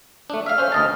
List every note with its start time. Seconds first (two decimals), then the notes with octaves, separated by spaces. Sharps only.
0.30 A3 D4
0.46 E5 F5 F6
0.58 C#4 C5 F5
0.72 D2 D#5 A5